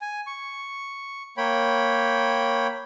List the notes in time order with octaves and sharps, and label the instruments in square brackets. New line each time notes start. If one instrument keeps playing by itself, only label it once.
[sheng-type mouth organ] G#5
C#6
A#3 C#5 G5 B5